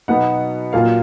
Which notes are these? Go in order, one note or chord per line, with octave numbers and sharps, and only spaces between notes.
B2 F#3 B3 D#4 F#5
A#2 F#3 A#3 F4 F5